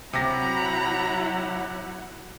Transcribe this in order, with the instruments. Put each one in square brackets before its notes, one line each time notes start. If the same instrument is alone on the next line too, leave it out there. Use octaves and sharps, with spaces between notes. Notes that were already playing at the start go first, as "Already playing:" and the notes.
[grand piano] C3 A#6 [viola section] F#3 E4 F#5 [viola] A#5 B5